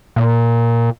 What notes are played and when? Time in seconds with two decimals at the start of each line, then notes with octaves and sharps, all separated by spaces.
0.16 A#2